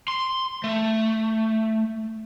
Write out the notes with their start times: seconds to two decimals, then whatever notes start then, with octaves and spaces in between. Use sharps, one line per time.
0.08 C6
0.64 A3